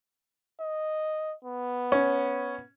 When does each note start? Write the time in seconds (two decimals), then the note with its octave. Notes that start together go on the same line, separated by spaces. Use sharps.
0.61 D#5
1.44 B3
1.92 C#4